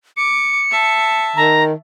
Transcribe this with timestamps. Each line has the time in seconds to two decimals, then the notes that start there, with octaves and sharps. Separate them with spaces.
0.17 D6 C#7
0.71 E5 A5
1.36 D#3 A#5